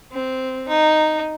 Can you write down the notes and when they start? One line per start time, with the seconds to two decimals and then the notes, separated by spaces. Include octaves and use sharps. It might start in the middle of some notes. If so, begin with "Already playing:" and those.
0.12 C4
0.69 D#4